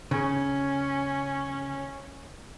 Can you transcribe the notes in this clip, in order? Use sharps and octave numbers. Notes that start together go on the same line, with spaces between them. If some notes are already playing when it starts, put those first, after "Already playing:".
C#3 C#4